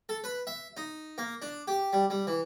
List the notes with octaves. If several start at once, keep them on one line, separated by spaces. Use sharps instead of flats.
A4
B4
E5
D#4
A#3
D4
G4
G3
G3
E3